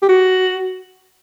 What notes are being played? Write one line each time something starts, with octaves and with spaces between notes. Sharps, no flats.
G4
F#4